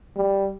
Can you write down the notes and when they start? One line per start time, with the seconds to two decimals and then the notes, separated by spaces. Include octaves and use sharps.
0.16 G3